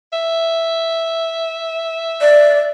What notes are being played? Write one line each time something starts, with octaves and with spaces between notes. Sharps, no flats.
E5
D5